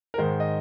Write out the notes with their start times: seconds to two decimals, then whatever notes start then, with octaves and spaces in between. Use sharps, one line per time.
0.14 A#4
0.18 G#2 D#3 G#3 C5
0.40 D#5